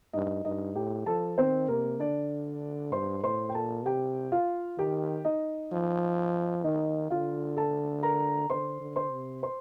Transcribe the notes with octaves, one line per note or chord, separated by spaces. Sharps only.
G2 D#4 D#5
G2 D#4 D#5
A2 G4 G5
F3 A4 A5
D#3 C4 C5
C3 A#3 A#4
D3 D4 D5
G2 C5 C6
A2 C5 C6
G5
A#2 A4 A5
C3 G4 G5
F4 F5
D#3 G4 G5
D#4 D#5
F3
D#3 D#4 D#5
D3 F4 F5
A4 A5
A#4 A#5
D3 C5 C6
D3
C5 C6
C3
C5 C6